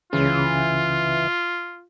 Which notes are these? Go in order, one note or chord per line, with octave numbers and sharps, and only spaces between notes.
C#2 C#3 E3 F4